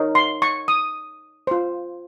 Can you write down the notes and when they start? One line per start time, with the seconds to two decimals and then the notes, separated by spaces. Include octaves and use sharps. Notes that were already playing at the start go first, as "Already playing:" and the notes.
Already playing: D#4 A#4 C#5
0.15 C6
0.42 C#6
0.68 D#6
1.47 F4 C5